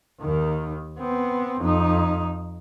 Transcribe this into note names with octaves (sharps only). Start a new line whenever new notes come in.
D#2 D#3
B3 C4
F2 D#4